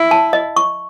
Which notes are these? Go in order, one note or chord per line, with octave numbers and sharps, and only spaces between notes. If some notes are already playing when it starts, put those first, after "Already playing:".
Already playing: E4
A5
D#5
C#6